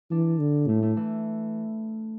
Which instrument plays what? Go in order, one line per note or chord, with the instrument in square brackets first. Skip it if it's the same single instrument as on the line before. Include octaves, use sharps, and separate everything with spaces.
[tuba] E3 [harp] D4
[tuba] D3
[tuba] A2 [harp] A3
[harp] A3
E3